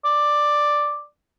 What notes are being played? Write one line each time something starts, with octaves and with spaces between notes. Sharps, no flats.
D5